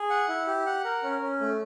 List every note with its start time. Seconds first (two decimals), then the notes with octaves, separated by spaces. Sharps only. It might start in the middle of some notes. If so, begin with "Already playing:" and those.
Already playing: G#4
0.10 F#5
0.29 E4
0.47 G4
0.66 F#5
0.85 A#4
1.03 C#4
1.22 C#4
1.40 A3